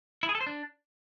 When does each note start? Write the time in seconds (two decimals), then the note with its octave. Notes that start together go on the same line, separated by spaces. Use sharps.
0.23 E4
0.29 G#4
0.35 A4
0.41 C5
0.47 D4